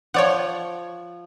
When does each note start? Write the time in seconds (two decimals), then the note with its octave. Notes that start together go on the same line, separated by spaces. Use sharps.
0.14 F3 C#5 D5 F#5